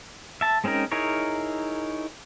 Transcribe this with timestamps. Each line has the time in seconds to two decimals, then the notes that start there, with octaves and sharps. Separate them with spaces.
0.41 E5 A5
0.64 G#3 C4 C#4 D#4 A#4
0.92 D#4 E4 G#4 A#4 C#5